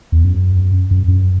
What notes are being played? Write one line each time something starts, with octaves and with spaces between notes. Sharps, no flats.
E2
F#2
F#2
F#2